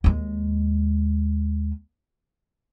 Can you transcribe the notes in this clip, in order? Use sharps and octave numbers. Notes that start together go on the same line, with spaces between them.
D#2 G#3